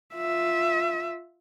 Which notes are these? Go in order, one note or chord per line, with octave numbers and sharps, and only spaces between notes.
F4 E5